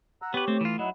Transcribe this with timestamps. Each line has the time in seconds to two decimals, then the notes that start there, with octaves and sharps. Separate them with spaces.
0.22 F#5 A#5 E6
0.34 B3 G4 B4 C#5
0.48 A3 C4
0.61 E3 F4
0.79 F#3 D#4 E4 F#5